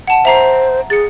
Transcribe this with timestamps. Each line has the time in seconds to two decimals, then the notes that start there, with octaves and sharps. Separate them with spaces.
0.08 F#5 A5
0.25 C5 E5 A#5 C7
0.90 G#4 A6 C#7